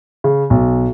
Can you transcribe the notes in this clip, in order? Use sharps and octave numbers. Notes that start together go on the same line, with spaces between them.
C#3
B1